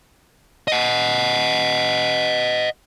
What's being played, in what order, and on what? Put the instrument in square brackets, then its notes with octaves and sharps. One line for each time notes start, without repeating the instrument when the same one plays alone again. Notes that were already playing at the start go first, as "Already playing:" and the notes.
[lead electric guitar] D#5 F#5